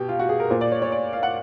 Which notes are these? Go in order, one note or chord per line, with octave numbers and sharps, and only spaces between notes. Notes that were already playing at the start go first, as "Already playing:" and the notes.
Already playing: B2 G4
F4
F#4
G#4
A#4
A#2 C5
D5
C#5
C#5
D5
F5
F#5